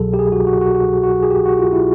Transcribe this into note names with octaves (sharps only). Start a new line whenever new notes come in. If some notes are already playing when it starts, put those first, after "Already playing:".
Already playing: C2 B2 F#3 G#4 A4
G4
G#4
F#4
F#4
F#4
F#4
F#4
G#4
G4
F#4
F4
E4